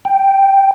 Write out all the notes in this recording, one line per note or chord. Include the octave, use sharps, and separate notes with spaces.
G5